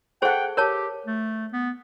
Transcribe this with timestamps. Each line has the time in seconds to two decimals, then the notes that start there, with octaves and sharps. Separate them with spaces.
0.22 G#4 A4 C5 F#5 G5
0.57 G4 A#4 C#5 A5
1.06 A3
1.53 B3